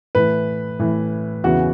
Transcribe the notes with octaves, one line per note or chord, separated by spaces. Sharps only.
A2 E3 B4
A2 E3
E2 C#3 E3 F#4